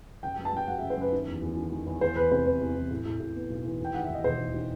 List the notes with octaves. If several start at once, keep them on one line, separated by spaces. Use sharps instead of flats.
F#1 G5
F#2 G5
A5
F#2 G5
F#3 F#5
F#1 E5
C5
F#2 B4
D#3
E2
E2
D#3
D#3
E2
E2 C5
E2 B4
C3 C5
E2 C5
E2
E2
A2
A2
A2
B3
B1
E3
D#2 G5
D#3 F#5
E5
D#2
D#5
E1 C5
D#2
D#3